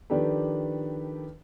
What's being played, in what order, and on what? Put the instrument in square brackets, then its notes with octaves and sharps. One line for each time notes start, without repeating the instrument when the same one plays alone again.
[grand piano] D#3 F3 D4 G4 A4 B4